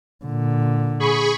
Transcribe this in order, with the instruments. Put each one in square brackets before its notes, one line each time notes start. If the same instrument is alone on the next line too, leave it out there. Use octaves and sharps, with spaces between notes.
[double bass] A#2 D3
[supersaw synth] G#4 B5 C#6